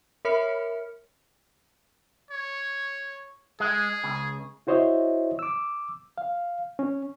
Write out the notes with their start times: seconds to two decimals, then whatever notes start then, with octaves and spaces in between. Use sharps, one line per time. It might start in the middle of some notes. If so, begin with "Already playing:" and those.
0.25 A#4 C#5 E5 B5 F6 C#7
2.31 C#5
3.60 G#3 G#4
4.04 C#2 C#3
4.67 E4 F#4 C5 C#5 D#5 E5
5.39 D6 E6
6.18 F5
6.79 C#4